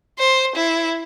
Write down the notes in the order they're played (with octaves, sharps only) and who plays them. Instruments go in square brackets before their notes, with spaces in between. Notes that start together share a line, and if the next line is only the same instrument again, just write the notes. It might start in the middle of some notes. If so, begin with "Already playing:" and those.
[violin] C5
E4